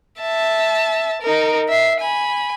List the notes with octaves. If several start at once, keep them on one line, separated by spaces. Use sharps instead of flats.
E5 A5
D#4 A#4
E5 C7
G#5 B5